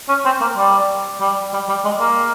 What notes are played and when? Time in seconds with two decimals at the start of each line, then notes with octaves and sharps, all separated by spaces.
0.09 C#4
0.25 C4
0.41 A#3
0.57 G3
1.20 G3
1.53 G3
1.69 G3
1.85 G#3
2.00 A#3